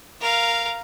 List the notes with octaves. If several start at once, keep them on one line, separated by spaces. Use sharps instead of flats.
A#4 F5